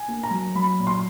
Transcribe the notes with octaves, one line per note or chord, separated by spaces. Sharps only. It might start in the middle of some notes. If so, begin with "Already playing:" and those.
Already playing: G#5
A#3
A#5
F#3
F#3 B5
A#2
C6